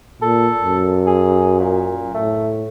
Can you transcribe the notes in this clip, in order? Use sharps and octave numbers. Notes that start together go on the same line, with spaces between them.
A#2 A4
F#2
G#4
A#2
A2 A3